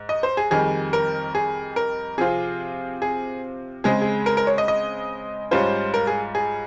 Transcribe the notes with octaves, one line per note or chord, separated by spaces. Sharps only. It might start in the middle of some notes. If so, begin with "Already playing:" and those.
Already playing: G#2
D#5
C5
G#4
F2 D#3 G3 G#4
A#4
G#4
A#4
C3 F3 C4 F4 G#4
G#4
C#3 G#3 C4 G#4
G#4
A#4
A#4
C#5
D#5
D#5
G#2 G3 C#4 F4 C5
A#4
G#4
G#4